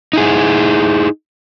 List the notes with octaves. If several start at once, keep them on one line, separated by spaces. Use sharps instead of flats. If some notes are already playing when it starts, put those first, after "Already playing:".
D#4 E4 G#4